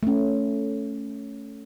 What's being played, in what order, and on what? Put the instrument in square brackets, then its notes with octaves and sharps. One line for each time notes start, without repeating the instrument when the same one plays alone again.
[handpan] A3 C#4